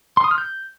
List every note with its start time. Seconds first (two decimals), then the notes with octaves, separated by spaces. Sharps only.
0.17 C6
0.24 D#6
0.31 F6
0.38 G6